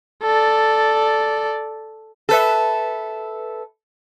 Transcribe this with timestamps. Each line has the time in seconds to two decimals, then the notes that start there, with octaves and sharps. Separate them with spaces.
0.23 A4 D5
2.29 A4 B4 E5